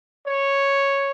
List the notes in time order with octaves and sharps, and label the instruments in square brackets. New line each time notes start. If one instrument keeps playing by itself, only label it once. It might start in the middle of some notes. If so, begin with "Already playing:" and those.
[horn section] C#5